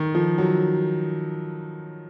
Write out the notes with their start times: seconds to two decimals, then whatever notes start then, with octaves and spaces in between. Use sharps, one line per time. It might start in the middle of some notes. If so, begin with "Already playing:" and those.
Already playing: D#3
0.15 F3
0.38 F#3